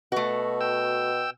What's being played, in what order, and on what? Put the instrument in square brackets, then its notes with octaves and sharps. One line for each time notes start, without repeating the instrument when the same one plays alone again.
[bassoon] B2 [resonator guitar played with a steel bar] A3 F#4
[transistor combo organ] G5 E6